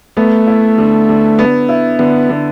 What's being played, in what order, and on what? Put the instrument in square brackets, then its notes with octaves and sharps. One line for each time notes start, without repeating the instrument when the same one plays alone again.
[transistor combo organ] A3 [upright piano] B3
[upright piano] E4
D3
D3
B3
E4
[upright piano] D3 [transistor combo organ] B3
[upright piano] D3